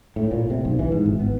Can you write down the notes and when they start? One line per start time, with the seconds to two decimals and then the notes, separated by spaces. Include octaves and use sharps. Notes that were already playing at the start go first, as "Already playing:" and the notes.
0.16 A2
0.31 A#2
0.50 C3
0.65 B1
0.79 E3
0.92 G#2
1.06 G#1
1.20 B3